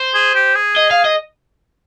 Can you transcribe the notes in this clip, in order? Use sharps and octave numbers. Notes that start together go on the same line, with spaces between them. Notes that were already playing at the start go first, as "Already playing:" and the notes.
Already playing: C5
G#4
G4
G#4
D#5
F5
D#5